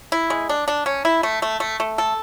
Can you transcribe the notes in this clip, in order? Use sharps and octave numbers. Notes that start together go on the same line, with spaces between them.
E4
G#3
D4
D4
C#4
E4
A3
A3
A3
A3
A4